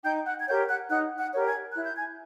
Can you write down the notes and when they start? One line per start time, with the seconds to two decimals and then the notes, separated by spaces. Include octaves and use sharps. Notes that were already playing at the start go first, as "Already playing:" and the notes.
0.04 D#4 G5 G6
0.25 F#5 F#6
0.40 G#6
0.47 G4 A#4 C#5 G5 G6
0.68 F#5 F#6
0.90 D#4 F#5 F#6
1.18 F#5 F#6
1.33 G4 A#4 C#5
1.46 G#5 G#6
1.70 F#6
1.75 E4
1.83 G6
1.96 G#5 G#6